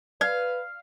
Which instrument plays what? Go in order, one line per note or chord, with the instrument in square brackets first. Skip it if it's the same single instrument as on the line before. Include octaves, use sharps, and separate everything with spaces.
[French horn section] B4 [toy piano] D5 [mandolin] F5